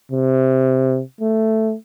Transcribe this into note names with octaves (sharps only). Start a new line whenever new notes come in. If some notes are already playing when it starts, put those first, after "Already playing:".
C3
A3